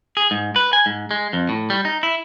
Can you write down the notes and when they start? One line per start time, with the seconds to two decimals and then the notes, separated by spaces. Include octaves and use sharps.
0.17 G#4
0.31 G#2
0.56 B4
0.73 G#5
0.86 G#2
1.11 G#3
1.33 F2
1.49 A2
1.70 G3
1.85 D#4
2.03 E4